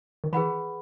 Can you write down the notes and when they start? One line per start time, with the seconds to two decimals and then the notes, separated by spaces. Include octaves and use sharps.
0.24 D#3
0.33 E3 G#4 B4 F#5 B5